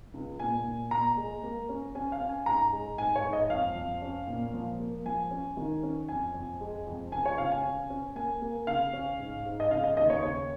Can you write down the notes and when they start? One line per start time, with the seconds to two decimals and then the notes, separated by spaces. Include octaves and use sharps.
0.14 C#2
0.39 A#2 G#5
0.65 A#2
0.91 A#2 A#5
1.17 G#3
1.43 A#3
1.69 C#4
1.95 C#4 G#5
2.12 F5
2.21 C#4
2.29 G#5
2.46 G#2 A#5
2.72 G#3
2.98 G#2 G#5
3.16 C#5
3.24 G#2
3.33 D#5
3.50 F2 F5
3.75 F2
4.02 C#4
4.27 A#2
4.54 F3
4.79 A#3
5.05 F3 G#5
5.31 C#4
5.57 D#3
5.83 C#4
6.09 F2 G#5
6.35 F2
6.60 G#3
6.87 F2
7.12 C#2 G#5
7.25 C#5
7.38 C#3 F5
7.51 G#5
7.64 C#4
7.90 C#4
8.15 A#3 G#5
8.42 A#3
8.67 C#3 F5
8.93 C#4
9.19 G#2
9.45 G#2
9.60 D#5
9.71 C#3 F5
9.84 D#5
9.97 D#2 D#5
10.10 C#5
10.23 C#3 C#5